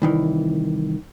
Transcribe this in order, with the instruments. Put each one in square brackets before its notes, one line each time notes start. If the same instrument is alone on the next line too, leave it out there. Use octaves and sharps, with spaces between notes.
[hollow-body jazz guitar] C2 D#3 E3